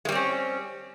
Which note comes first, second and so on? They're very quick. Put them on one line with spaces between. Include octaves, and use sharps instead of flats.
G#3 G3 C4 C#4